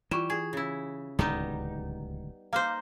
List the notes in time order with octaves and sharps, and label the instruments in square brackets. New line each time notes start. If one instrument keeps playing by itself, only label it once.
[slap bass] E3 [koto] G3 [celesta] F4 C#6 E7
[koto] G#4
C#3 E4
[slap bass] D1 C#2 D#3 [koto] G3 B3 D#4
[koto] A#3 D#4 C5 [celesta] F5 D6 F6